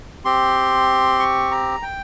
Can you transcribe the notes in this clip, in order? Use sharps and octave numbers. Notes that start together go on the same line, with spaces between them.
C4 G4 C6
C#6
A#5
G5